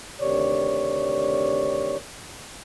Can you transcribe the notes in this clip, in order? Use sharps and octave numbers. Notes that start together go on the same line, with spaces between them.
D2 C3 D#3 C#5 D5